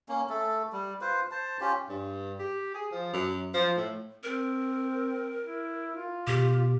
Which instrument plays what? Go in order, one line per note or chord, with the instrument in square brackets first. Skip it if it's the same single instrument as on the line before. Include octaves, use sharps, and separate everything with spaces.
[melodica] A#3 C#4
A3 A4
G3
F4 B4 C5
C5 A5
C#4 F4 G4
[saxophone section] G2
G4
G#4
F3
F#2
F3
A2
[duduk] C4 [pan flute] A#4
[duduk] E4
F4
[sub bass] B2 [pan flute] G4